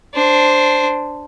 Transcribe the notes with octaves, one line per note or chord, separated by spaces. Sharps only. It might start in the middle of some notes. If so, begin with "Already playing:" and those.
D4 C5